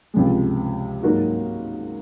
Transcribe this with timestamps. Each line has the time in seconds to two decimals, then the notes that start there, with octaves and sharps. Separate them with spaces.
0.14 C#2 C3 F3 G#3
1.03 G#2 F#3 A#3 D#4 F#4